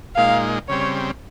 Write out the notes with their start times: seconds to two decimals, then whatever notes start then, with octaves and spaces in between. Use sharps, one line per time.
0.16 A#2 G#3 D#4 F5
0.69 C#3 G3 C4 C#5